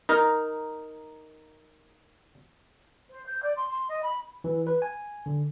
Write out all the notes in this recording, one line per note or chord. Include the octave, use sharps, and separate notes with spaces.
D#4 A#4
C5
G6
D5
C6
C6
D#5
B5
E3
B4
G#5
D3